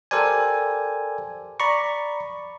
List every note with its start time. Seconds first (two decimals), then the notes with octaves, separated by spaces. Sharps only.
0.11 G4 A4 A#4 C5 D5 G#5
1.60 D5 A#5 B5 C#6